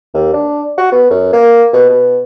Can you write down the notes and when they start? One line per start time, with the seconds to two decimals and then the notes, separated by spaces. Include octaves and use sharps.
0.15 D#2
0.34 D4
0.78 F#4
0.92 B3
1.11 F#2
1.33 A#3
1.74 B2
1.90 B2